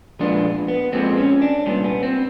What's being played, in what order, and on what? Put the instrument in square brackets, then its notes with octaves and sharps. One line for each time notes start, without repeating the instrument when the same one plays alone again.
[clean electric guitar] A#2 F3 G#3 B3 D4
B3
A#2 F3 G#3 B3 C4
C#4
D4
C2 A#2 G3 B3 C#4
B3
C4